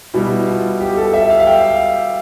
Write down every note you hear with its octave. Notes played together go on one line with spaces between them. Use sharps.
B2 G3 E4
F4
G4
A4
E5
F5
F5
G5